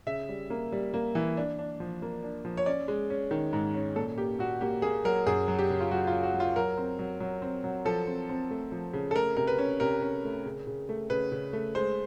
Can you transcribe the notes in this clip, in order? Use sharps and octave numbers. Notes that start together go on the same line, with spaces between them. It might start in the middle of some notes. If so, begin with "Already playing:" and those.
C#3 E5
G3
A#3
G3
A#3
E3
D4
D4
F3
A#3
D4
F3
C#5
C#4 D5
G#3
C#4
D#3
G#2
C#4
A#2 A4
A#3 G4
A#2 F#4
A#3 G4
A#3 G#4
F#3 A#4
F#2 G#4
F#3
G4
C#3
F4
F#3 F#4
F4
F#3
F#4
F#3
F4
F#3 A#4
C4
F#3
F#3
C4
F#3
F3 A4
C4
C4
A3
F3
C#3
A4
A3 A#4
C3 A#4
B4
C#4
C3 A#4
C#4
A3
C#3
C#3
A3
C#3 B4
C#3
A3
G#3 C5